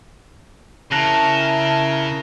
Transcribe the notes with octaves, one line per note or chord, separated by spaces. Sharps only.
C#3 E4 A#4 A5 F#6 A#6 F7